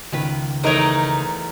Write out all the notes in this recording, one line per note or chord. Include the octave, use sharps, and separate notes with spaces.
C#2 D#3 B4
E2 A3 D#4 A#4 C#5 D#5